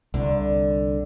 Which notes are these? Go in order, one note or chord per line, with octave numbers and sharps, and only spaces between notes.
C2 D3